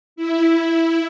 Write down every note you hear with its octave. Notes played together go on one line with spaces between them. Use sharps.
E4